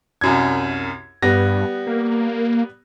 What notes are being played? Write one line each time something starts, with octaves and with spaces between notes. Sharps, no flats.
C2 F#2 G#6
G2 G3 B3 A#6
A#3